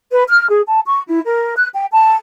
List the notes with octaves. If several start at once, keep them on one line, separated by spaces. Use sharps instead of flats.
B4
F6
G#4
A5
C#6
E4
A#4
F#6
G5
A5